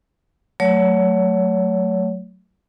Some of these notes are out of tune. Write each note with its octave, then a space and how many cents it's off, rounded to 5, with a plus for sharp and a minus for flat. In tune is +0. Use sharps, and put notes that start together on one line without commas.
F#3 +0 A3 +0 C#5 +30